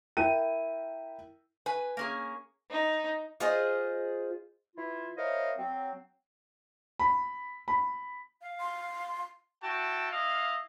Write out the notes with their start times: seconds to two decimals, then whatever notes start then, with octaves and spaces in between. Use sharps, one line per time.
0.17 E4 A#4 G5 D#7
1.66 B4 G#5
1.97 A#3 C#4 G#4
2.71 D#4
3.40 F4 G#4 C5 D#5
4.76 E3 E4 F4
5.17 E4 A#4 C5 C#5 D#5 F5
5.58 F#3 C4
6.99 B5
7.68 B5
8.42 F5
8.60 C6
9.63 E4 F#4 G5 A5
10.11 E4 D#5 F5